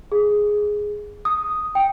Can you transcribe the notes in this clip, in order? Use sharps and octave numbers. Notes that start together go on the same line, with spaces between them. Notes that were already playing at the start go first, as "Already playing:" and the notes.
G#4
D#6
G5